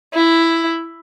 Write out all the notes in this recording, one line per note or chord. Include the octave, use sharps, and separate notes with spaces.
E4